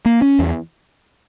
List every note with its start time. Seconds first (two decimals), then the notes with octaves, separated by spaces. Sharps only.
0.06 A#3
0.22 C#4
0.39 E2